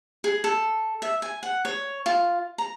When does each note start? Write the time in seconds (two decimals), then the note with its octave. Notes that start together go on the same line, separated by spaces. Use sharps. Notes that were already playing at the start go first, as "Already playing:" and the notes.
0.24 G#4
0.44 A4
1.02 E5
1.22 G#5
1.43 F#5
1.65 C#5
2.06 F4
2.58 A#5